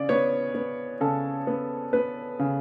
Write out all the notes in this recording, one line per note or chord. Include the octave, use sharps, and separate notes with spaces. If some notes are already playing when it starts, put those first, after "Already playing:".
Already playing: C#3 D5
B3 C#5
B3
C#3 A4
B3
B3 B4
C#3